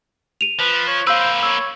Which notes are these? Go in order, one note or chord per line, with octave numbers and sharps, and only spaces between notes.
D#7 F7
F3 B4
C#5
A#3 B4 C5 F5 E6
C#5 E6